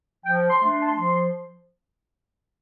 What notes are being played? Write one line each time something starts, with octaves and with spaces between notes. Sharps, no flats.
F3 G5
C6
A3 D4
C6
A5
C6
F3